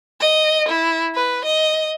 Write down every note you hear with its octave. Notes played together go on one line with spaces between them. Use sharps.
D#5
E4
B4
D#5